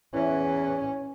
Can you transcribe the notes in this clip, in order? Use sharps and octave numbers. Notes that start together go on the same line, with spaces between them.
E2 E3 C#4